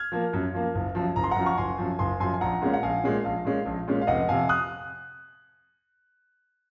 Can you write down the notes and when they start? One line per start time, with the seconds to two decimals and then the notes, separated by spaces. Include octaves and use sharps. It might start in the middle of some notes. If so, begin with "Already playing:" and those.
Already playing: F6 G#6
0.12 F3 A#3
0.33 F#2
0.54 F3 A#3
0.75 F#1
0.95 F#2 F3
1.16 F#1 A#5
1.24 C6
1.31 F#5 A#5
1.37 F#2 F3
1.46 C#6
1.57 F#1 G#5 C6
1.78 F#2 F3
1.99 F#1 G#5 C6
2.20 F#2 F3 G#5 C6
2.34 G#5
2.41 A#1 F#5 A#5
2.61 A#2 G#3 C#4
2.74 F#5
2.82 A#1 F5 G#5
3.04 A#2 G#3 C#4
3.24 A#1 F5
3.45 A#2 G#3 C#4
3.66 A#1
3.88 A#2 G#3 C#4
4.01 F5
4.07 F1 D#5 F#5
4.29 F2 C3 F5 G#5
4.49 D#6 F#6